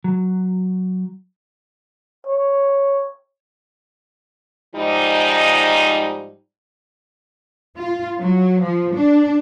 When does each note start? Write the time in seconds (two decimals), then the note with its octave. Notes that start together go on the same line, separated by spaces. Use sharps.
0.04 F#3
2.27 C#5
4.75 G#2 F3 G3 D#4
7.77 F4
8.20 F#3
8.64 F3
8.96 D4